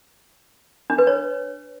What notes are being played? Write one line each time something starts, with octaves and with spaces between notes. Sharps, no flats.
D4
B4
C#5